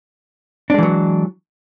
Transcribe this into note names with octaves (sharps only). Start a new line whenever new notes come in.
E3 F#3 G#3 D4